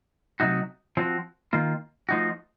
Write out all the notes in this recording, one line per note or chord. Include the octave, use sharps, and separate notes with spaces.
C3 F#3 A3 D#4 F#4
F3 C4 F#4
D#3 A#3 F4
F3 A3 D#4 F#4